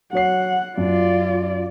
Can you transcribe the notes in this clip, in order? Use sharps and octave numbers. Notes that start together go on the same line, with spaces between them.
F#3 C#5 F#5 C7
F#2 F4 D5